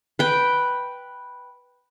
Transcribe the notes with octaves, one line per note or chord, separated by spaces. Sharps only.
B4 G5